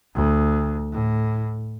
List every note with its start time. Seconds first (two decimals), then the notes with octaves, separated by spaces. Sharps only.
0.15 D2
0.92 A2